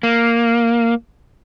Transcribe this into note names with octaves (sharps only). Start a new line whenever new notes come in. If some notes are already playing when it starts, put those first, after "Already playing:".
A#3